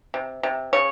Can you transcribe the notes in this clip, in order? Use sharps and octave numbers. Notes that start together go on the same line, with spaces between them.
C3
C3
C#3 C#5